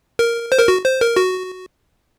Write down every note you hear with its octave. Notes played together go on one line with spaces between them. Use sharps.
A#4
C5
A#4
F#4
C5
A#4
F#4